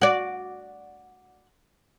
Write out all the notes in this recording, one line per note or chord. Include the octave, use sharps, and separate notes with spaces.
F#4 D5